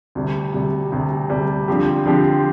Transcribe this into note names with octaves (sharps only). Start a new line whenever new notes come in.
D2 C3 G3
D2 C3 G3
D2 C3 G3
D2 C3 G3
D3 F3 C4 G4
D3 F3 C4 G4